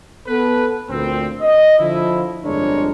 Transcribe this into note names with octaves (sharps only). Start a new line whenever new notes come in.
B3 A4 B4
D2 A#2 C4
D#5
D3 F3 E4
G1 F2 G#3 D4 A#4 C#5